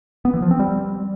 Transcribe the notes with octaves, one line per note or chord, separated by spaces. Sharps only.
B3
E3
F3
C4
G3